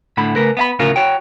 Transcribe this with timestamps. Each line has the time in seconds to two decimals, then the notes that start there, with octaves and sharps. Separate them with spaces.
0.17 A2 D3 F#5 B5
0.35 C#3 A3 A#4 B4
0.57 B3 F5 B5
0.79 D2 A2 C#3 F4 F#4 A#4
0.96 F#4 C#5 G5